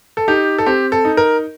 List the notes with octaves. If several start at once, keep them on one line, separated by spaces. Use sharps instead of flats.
A4
D#4 G4
A4
C4 G4
A4
D#4
A#4